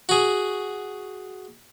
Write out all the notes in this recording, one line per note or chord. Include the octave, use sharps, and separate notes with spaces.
F#4 G#4